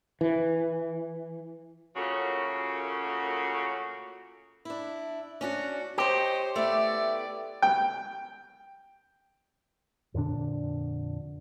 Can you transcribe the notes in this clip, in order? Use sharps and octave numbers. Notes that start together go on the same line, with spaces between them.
E3
A#2 C#3 A3 A#3 C#4 F#4
D4 E4
C#4 D4 F#4
G4 C5 C#5 D#5
A3 B3 E4 D5
G5
F2 A#2 D3 D4